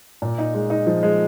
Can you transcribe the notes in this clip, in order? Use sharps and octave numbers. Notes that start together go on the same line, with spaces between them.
A#2
D#4
G#3
D#4
F3
G#3